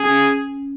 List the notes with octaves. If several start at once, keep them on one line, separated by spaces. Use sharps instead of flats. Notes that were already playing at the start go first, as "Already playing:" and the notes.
Already playing: C#4 G#4